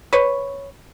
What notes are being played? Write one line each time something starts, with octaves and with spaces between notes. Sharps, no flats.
B4 C#5